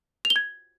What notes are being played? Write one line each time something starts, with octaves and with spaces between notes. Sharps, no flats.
F7
G7
G#6